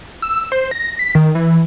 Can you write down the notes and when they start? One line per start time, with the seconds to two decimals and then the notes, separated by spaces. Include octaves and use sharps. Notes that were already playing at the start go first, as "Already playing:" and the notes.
0.22 E6
0.52 C5
0.71 A#6
0.99 B6
1.15 D#3
1.35 E3